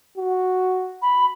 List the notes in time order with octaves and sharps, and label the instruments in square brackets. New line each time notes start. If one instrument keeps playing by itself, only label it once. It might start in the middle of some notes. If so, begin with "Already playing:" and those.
[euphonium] F#4
[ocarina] B5